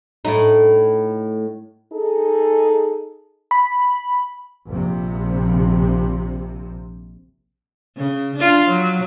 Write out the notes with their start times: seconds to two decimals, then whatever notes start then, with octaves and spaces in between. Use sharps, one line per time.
0.25 A2 A3 D#4
1.93 D#4 G#4 A4
3.51 B5
4.67 A#1 C3
7.97 C#3
8.36 D4 F4
8.66 F#3